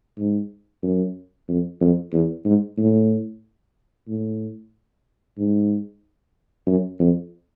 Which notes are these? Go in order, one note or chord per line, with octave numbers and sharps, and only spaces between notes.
G#2
F#2
F2
F2
E2
G#2
A2
A2
G#2
F#2
F2